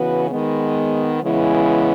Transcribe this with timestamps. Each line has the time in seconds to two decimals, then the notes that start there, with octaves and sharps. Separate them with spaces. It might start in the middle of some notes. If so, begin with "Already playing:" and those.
Already playing: C#3 E3 B3 F#4 B4
0.30 D#3 G#3 B3
1.23 C#3 E3 G#3 B3 E4